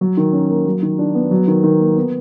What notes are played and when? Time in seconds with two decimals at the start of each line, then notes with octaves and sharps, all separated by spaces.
0.01 F#3
0.17 D#3
0.33 C#4
0.50 A#3
0.67 F#3
0.83 D#3
0.99 D4
1.15 B3
1.31 F#3
1.48 D#3
1.64 D#3
1.80 A#3
1.97 B3